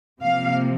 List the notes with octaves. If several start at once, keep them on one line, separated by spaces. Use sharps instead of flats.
C3 F3 A#3 F5